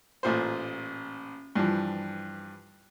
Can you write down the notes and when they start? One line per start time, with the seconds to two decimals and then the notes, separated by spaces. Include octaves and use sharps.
0.23 A1 A#2 C5
1.55 G2 E3 F3